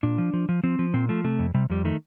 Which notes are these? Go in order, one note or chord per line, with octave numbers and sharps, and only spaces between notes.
A#2 D4
F3
F3
F3
F3 C4
F3
A#2 C4
F3 A3
C3 A3
F2
C3 G3
F2 G3
D#3 A3